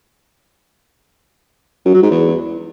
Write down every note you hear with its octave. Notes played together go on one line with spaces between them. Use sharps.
F#2
F#3
G#2
E2